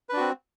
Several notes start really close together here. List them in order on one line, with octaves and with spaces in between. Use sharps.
B4 D4 F#4 C4